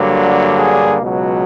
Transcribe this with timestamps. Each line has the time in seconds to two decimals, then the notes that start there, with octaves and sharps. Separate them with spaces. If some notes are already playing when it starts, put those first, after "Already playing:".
Already playing: G2 D3 F#3 A#3
0.58 G#4
1.01 C#2 B2 F#3